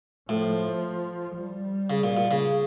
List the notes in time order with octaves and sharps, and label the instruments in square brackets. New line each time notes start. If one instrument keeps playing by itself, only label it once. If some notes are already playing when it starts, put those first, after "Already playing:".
[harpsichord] A2 [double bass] F3
[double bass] G3
[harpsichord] C#3
A#2
A#2
C#3